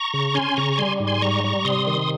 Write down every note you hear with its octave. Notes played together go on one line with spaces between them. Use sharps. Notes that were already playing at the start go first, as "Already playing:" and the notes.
Already playing: A#5 C#6
C#3
C#4 G#5 C6
C#3 A#5 C#6
G3 G#5 C6
G#2
G#5 C6
G3 A#5 C#6
G3
C3 C6 D#6
D#3